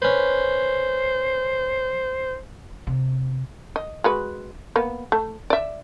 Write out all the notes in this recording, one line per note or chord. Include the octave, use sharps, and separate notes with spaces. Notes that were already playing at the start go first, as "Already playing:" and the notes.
C#4 B4 C5
C3
D#5
G#3 F#4 B4
A#3 B3
A3
D5 E5